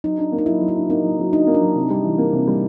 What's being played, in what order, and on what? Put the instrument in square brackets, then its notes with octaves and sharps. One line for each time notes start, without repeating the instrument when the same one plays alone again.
[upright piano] F#3 [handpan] D#4
[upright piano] D4
A#3
[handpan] D#4
[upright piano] F#3 [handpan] E4
[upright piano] F#3
[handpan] E4
[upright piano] D4
[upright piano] A#3 [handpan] D#4
[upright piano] F#3
F#3
[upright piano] D4 [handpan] D#4
[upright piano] A#3
[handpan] D4
[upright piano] F#3
C3
G3
E3
A#3
C3
G3